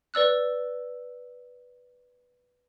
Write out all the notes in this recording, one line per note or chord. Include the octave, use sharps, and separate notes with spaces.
B4 D5 E6 F#6